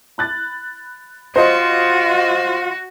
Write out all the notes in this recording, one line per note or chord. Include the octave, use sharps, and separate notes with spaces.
B5 F#6 A6
F4 F#4 C5 D#5